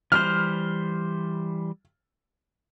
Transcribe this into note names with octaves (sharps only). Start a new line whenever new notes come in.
E3 G3 C5 F6